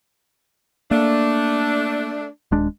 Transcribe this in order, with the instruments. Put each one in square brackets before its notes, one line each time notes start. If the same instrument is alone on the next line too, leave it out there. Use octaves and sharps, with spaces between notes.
[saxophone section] A3 D4 [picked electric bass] A#3
[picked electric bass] D#1 G#3 D4